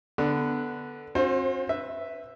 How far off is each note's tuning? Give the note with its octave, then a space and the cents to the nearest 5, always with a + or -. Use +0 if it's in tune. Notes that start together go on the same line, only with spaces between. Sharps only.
D3 +0 B3 +0
C4 +40 F#4 -40 C5 +15
B4 +0 E5 +0